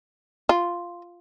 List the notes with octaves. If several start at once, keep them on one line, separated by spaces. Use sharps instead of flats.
F4